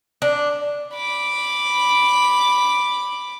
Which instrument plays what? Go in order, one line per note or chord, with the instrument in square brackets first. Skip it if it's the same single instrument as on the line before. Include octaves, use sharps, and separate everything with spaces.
[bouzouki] D4
[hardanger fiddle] B5 D6